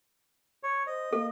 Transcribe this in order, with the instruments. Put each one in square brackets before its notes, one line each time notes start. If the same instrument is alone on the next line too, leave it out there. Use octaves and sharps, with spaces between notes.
[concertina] C#5
[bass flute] C5 [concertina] D#5
[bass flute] A#3 [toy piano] A4